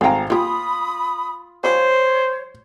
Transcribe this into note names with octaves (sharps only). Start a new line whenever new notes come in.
G#1 A3 F5 G5 A#5
A#3 F4 G4 B5 D#6
F3 G3 C#4 C5 C#5